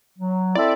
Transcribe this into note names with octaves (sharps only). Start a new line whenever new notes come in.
F#3
C4 E4 A4 D5 E5